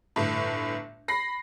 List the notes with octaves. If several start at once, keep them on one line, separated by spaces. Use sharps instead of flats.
G1 A2
B5 A#6 C7